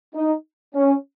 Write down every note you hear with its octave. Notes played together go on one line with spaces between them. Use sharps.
D#4
C#4